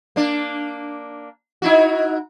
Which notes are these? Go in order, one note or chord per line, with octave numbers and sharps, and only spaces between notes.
A#3 D4
D#4 E4 F#4